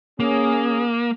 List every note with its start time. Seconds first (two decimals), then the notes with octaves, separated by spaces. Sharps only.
0.20 A#3 C#4 G#4